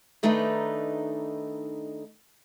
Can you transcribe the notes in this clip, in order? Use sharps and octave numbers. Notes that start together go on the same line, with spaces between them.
D#3 A3 D4 D#4 B4